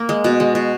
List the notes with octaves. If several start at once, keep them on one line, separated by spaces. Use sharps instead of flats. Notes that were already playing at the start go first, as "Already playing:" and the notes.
Already playing: A#3
G#3
B2
G#3
B2